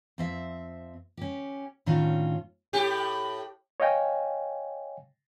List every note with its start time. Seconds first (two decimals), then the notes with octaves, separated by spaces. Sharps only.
0.18 F2 C4 E5
1.17 C#4 G4
1.86 A2 D#3 C#4 D4 F4 F#4
2.73 A2 G4
3.80 C#5 D#5 F5 G5 G#5